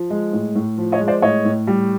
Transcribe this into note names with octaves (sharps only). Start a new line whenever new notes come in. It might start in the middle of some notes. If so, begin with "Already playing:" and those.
Already playing: F3
G#3
A2
A2
F3
C#5 D#5
G#3
C5 D5
A2 C#5 D#5
A2
G3